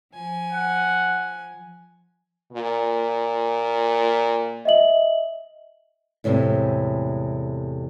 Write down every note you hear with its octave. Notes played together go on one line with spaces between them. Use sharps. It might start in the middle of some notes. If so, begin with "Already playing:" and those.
F3 G#5
F#5
A#2
D#5 E5 F#7
E2 A2 C3 G#3 A3